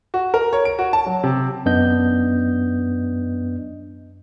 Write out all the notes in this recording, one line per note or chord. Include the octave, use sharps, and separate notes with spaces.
F#4
A#4
C#5
D7
F#4
A5
F#3
C3
F#2 B3 D4 D#5 G6